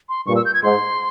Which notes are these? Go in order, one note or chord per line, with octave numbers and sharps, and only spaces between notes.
C6
G2 A#2 C#6
E6
G6
G#6
G#2 C6